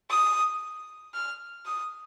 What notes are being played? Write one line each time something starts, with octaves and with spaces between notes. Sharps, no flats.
D#6
F6
D#6